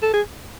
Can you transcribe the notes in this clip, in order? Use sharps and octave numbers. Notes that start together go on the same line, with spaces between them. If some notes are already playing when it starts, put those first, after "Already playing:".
A4
G#4